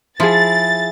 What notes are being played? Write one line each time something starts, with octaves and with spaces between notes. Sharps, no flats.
F3 E4 G#4 A6